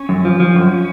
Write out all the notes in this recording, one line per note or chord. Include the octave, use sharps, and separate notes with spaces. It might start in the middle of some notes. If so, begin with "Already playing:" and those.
Already playing: C#4
F#2
F3
F3
F#2